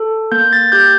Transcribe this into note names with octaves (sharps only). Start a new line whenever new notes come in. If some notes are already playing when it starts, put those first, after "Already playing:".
Already playing: A4
A#3 G6
A6
G4 G6